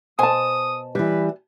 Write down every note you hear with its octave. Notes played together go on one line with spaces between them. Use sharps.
B2 C5 G#5 A5 D#6
E3 G3 B4